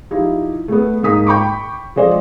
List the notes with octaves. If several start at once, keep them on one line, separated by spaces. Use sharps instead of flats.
F3 D#4 E4 G4
A3 B3
G#2 A#3 D#4 D#6 B6
G5 B5 C#6 D6
F3 G#3 C5 D5 D#5